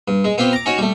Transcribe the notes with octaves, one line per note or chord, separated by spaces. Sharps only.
G2
G#3
B3 C4 F4 G4
A#5 D6
C#4 D#4 F#4 C#5
G3 A3